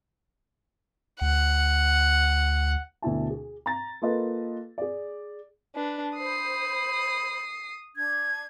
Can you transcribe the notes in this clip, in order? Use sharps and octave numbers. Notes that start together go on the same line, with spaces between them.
D2 F#5
D2 B2 E4 A5
G#4
A#5 A6
A#3 F4 A4 B4 D#5
G#4 D5
D4 B4
C5 B5 D#6 C7
D4 G#6